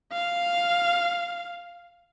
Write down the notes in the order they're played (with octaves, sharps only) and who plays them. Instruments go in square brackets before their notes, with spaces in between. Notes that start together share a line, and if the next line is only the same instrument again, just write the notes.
[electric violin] F5